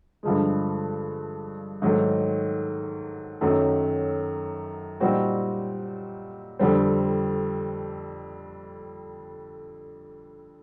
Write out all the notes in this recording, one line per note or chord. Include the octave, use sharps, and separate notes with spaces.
G2 D3 F3 G#3
G#2 D#3 F#3 A3
F#2 D#3 F#3 A3
A#2 G3 C4 D#4 F#4
F2 D3 G3 C4